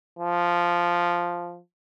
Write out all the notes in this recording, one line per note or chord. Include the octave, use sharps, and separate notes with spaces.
F3